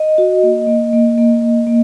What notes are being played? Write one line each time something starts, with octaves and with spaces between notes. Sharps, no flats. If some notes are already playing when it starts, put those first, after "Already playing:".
Already playing: D#5
F#4
A#3
A#3
A#3
A#3
A#3
A#3